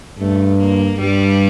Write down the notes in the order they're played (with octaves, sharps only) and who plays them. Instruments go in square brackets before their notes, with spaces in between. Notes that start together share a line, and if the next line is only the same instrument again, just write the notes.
[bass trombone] G2 [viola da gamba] A3
[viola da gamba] A#3
[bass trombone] G2 [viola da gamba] G3